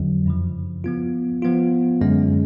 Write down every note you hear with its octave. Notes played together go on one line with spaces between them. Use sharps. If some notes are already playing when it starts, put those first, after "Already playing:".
Already playing: F2 D3 F#3
F#2 C#3 F3
F3 B3 F4
F3 B3 F4
F#2 D3 G#3 C#4